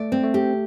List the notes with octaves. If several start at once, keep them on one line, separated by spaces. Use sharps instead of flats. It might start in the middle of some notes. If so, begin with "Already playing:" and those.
Already playing: A3 D5
C4
A3
G4